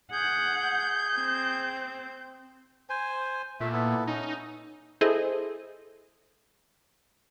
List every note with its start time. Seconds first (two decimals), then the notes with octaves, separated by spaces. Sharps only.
0.13 G#4 F#5 G6
1.15 C4
2.90 C5 G#5
3.60 A#2 A3 E5
3.72 B3 E4 A4
4.07 C#4 D#4
5.01 E4 G#4 A4 C5 D#5